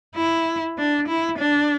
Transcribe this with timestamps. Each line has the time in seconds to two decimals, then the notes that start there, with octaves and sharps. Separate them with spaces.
0.16 E4
0.78 D4
1.08 E4
1.39 D4